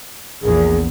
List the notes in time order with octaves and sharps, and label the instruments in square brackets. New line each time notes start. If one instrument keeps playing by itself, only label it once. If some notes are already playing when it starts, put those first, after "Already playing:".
[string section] A#1 E2 [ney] G#4